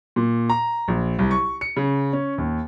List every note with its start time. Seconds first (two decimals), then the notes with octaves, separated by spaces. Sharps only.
0.16 A#2
0.49 A#5
0.88 A#1
1.19 C2
1.31 C#6
1.61 C#7
1.77 C#3
2.13 C#4
2.38 D#2